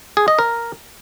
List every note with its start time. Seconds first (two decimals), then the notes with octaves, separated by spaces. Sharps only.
0.17 G#4
0.28 D#5
0.39 A#4